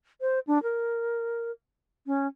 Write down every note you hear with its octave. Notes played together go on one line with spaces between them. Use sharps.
C5
D4
A#4
C#4